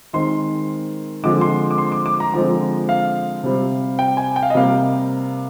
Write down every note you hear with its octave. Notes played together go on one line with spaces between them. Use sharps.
D#3 G#3 C4 C6
D3 F3 G#3 C4 D6
C6
D6
C6
D6
D6
A#5
D3 F3 G#3 C4
F5
C3 G3 C4
G5
G#5
G5
F5
D#5
C3 G3 A#3 F5